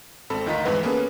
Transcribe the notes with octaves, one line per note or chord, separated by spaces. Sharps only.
G#1 C4 A4 B5
D2 D#3 F4 D#5 A#5 B6
F2 G#2 E3 B4 F#5
A#3 B3 C#4 G#4 A4 B4